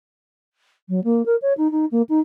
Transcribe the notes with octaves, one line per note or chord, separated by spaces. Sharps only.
F#3
A#3
A#4
C#5
D#4
D#4
A#3
D#4